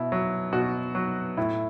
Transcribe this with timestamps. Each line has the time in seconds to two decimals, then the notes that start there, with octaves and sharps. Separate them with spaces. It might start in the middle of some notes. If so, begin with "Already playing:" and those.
Already playing: B2 E4
0.12 F#3
0.53 B2 F#4
0.95 F#3
1.37 A2 E4